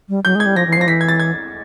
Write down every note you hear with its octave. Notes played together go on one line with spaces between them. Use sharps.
G3
F#3 G6
G#3
G#6
G3
F3 A#6
E3
F3 C7
A#6
E3 B6
G#6
A6
G#6